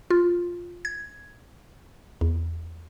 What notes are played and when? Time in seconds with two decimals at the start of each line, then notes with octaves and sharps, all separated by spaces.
0.10 F4
0.85 G#6
2.21 E2